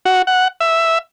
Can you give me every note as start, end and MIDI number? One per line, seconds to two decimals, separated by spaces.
0.05 0.22 66
0.27 0.48 78
0.61 0.98 76